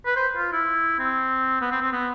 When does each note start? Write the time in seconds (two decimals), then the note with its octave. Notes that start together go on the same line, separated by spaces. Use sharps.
0.06 B4
0.16 C5
0.37 F4
0.53 E4
0.99 C4
1.61 B3
1.72 C4
1.82 C4
1.93 B3